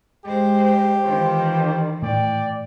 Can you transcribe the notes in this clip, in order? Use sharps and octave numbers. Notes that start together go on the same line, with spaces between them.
G#3 G4 C5
D#3 E3 F4 C5
A2 D5 G5